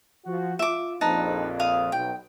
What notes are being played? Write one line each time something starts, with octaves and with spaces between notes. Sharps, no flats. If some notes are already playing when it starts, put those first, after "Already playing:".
F3 F#4
F4 E5 D6
A#1 F2 D#4 B4 A5
F5 D#6
B1 G5